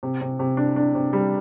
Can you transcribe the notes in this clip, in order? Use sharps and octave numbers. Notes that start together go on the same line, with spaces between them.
C3
C3
C3
D4
D4
C3
G3